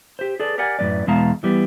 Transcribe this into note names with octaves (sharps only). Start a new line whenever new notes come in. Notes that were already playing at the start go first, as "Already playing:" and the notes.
G4 C5
G#4 A4 B4 D5
G4 A#4 D5 F#5 G#5
F#2 A2 C3 G#3 B4 D5
E2 B2 G#3 F5 A5 A#5
E3 G3 B3